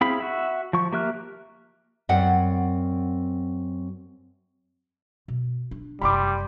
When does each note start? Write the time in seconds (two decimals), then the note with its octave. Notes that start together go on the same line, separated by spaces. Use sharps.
0.01 C4 E4 G#4 F5 B5
0.20 F#4 E5
0.73 F3 C#6
0.92 A#3 G4 E5 F6 F#6
2.09 F#2 C4 D5 F#5
5.28 B2
5.71 D4
6.01 F#1 C3 G3 B5 C6 D6